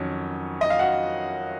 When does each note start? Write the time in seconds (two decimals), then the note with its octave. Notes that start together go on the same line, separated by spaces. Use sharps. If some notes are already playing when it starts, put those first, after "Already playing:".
Already playing: F2 D#3 F#3 C#4
0.61 D#5
0.70 F5
0.79 F#4 F#5